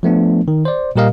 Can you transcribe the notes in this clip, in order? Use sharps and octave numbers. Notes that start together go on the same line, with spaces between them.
F3 A3 B3 D4
D#3
C5 D5
A#2 G3 G4 A#4 D#5 F5